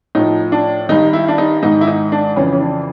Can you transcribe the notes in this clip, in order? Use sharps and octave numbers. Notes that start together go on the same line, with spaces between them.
A2 F3 D#4
D4
G2 D#3 D#4
E4
D4
D#4
G#2 D#3 D#4
E4
D#4
D4
F2 C#3 E3 C#4
C#4
D4